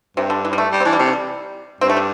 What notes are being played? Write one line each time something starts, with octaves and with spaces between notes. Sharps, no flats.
G2 C3
D3
E3
G3
A3
G3
C4
E3 D4
G3
C3 A3
E3
G3
G2 C4
A3
G3